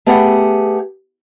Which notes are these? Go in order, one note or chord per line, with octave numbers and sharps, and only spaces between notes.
A3 B3 G4 G#4 F#5